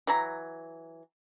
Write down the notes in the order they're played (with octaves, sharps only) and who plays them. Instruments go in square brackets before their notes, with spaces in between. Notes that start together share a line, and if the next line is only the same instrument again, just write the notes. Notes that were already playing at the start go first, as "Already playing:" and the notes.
[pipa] E3 F#3 A#5